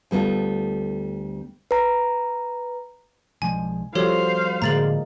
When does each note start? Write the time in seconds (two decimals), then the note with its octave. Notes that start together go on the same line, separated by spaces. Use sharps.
0.11 D2 G3 B3 F4 A4
1.71 B4 A#5
3.42 B1 F3 G#3 G#5
3.95 F3 G3 F#4 G4 A4 C5 C#5 F5
4.62 A2 D3 G#3 A#3 A#5 A6 F#7